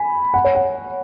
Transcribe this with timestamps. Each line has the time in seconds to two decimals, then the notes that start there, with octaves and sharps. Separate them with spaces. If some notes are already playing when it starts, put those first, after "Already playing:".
Already playing: G#5 B5
0.34 F#5
0.44 C#5
0.55 F#5